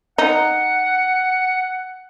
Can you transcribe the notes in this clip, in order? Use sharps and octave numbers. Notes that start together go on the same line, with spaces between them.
D#4 F#5